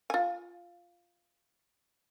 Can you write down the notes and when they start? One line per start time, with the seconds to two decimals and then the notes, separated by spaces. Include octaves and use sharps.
0.10 F4 G#5